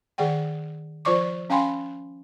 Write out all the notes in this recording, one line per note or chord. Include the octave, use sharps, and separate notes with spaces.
D#3 G#4 D5 F#5 G5
F3 F4 C5 D5 C#6 D6
C#4 F5 G5 G#5 B5 C6